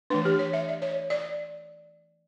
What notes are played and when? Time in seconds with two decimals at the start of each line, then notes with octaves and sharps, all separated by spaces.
0.10 E3 A3 D4 B4
0.25 G4
0.39 C#5
0.53 E5
0.68 D5
0.82 C#5
1.10 D5